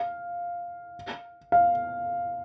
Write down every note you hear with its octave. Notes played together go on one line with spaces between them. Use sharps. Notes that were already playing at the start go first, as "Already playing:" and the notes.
Already playing: F5
F5